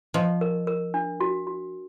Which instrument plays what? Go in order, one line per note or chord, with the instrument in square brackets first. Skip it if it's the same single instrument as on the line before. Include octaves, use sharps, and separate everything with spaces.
[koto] F3 [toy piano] D#5
[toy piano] A#4
A#4
D4
F#4
F#4